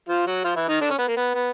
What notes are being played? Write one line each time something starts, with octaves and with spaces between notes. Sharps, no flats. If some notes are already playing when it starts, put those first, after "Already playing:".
F3 F4
F#3 F#4
F3 F4
E3 E4
D#3 D#4
D3 D4
C#4
B3
A#3
B3
B3